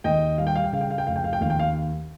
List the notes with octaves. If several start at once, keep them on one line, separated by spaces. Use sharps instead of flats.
D#2 D#5 G5
G3 F5
G5
F5
G5
C#3 F5
G5
F5
G5
F1 F5
G5
F5
G5
D#2 F5
G5
F5